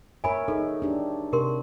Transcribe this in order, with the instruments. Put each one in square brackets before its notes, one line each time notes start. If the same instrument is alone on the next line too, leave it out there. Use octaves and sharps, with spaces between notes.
[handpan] A#4 C#5 E5 [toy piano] G#5 B5
[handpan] D#4 G#4 [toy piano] A4
[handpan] D4 G4
[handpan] C3 [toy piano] G4 A#4 C6